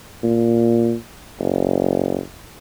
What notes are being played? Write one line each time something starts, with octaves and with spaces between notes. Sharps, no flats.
A#2
F#1